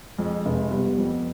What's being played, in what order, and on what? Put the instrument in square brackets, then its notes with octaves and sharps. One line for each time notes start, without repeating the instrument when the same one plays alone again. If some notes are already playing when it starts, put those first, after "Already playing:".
[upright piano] F2 [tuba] G#3
[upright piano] F1
[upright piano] G3 [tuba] B3
[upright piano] F2